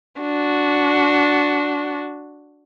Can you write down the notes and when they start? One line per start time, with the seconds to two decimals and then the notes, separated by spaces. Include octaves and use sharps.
0.19 D4 F#4